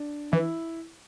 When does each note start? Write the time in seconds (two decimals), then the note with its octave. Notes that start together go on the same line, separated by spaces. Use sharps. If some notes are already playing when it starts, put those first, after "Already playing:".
Already playing: D4
0.32 E3 E4